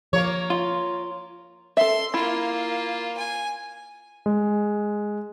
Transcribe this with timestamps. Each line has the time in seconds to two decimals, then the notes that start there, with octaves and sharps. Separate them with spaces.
0.13 F3 A#3 C#5
0.50 F4
1.77 A4 E5 C6
2.14 A#3 E4 F4
3.17 G#5
4.26 G#3